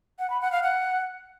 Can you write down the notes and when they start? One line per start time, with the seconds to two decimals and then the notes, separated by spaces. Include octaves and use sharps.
0.19 F#5
0.30 B5
0.41 F#5
0.52 F5
0.63 F#5